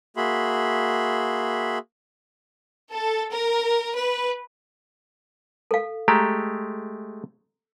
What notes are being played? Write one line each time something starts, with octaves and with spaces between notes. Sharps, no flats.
A#3 F#4 G#4 E5 B5 C6
A4
A#4
B4
A4 F5
G#3 A3 G4 A#5